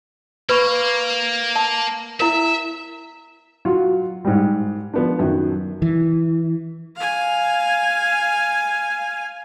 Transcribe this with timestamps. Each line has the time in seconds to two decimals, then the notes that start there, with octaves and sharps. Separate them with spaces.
0.49 A#3 B4 B5 C#6
1.56 A5
2.20 E4 A#4 E5
3.65 F#3 F4 F#4
4.25 G#2 G3
4.94 F3 B3 D4
5.19 F#2 D#3
5.82 E3
6.97 F5 G#5